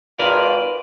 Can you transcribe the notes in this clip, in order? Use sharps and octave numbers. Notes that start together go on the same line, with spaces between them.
G#1 F4 A#4 B4 D5